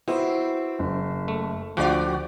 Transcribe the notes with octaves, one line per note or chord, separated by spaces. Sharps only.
B3 C4 E4 F#4 C5
F#1
A3
D2 F3 F#4 G4 D5 F#6